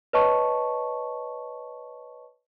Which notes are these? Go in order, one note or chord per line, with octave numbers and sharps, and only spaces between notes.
B4 C#5 D#5 A5 C#6